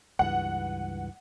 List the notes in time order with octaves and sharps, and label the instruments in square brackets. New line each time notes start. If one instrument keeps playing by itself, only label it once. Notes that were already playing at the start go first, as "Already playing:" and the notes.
[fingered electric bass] C#2 G2 E3 [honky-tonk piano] F#5